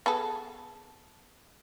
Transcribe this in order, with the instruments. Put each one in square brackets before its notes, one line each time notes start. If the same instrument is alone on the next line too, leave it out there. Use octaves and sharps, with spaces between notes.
[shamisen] B3 G#4 A4